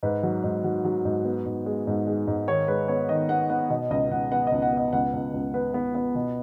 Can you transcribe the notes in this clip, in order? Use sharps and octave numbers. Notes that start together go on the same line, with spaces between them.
G#2 B4
F#3
G#2
F#3
F#3
G#2
B3
G#2
G#3
G#2
G#3
G#2
D#3 C#5
G#3 B4
B3 C#5
D#3 D#5
B3 F#5
B3 F#5
B2 D#5
C#2 D#5
C#2 F#5
B3 F#5
C#2 D#5
F#5
B3 D#5
C#2 F#5
C#2
C#2
B3 B4
B3
B3
B2